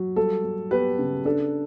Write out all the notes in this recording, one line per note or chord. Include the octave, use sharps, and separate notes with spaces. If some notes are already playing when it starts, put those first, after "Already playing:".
Already playing: F#3
G3 A4
G3
B3 G4 B4
C#3
D4 A4